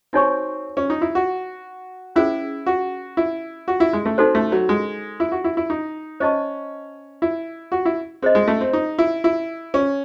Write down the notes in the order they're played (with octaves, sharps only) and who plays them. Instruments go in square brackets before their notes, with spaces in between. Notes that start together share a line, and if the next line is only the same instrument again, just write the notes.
[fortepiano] C4 [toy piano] D#4 F#4 C#5 G#5 C#6
[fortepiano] C#4
D#4
E4
F#4
[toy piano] C#4 G#4 C5 [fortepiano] E4
[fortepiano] F#4
E4
F#4
E4
G#3
A3
[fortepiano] C4 [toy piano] D#4 F#4 A4 C5
[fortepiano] A3
F#3
G#3
E4
F#4
E4
E4
D#4
[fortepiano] C#4 [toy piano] C5 D#5 A5 C#6
[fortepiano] E4
F#4
E4
[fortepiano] C4 [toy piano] G#4 C5 D#5
[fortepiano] G#3
A3
C4
D#4
E4
E4
C#4